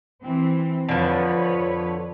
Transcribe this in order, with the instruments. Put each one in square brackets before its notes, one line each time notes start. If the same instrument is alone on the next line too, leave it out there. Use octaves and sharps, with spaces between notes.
[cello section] E3 C4
[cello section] F2 B4 C#5 [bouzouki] D3 F3